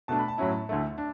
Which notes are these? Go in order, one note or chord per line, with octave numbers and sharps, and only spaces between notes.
B2 A3 D4 A5
B5
A5
A2 F#3 C#4 E4
D2 D3 A3 E4
D4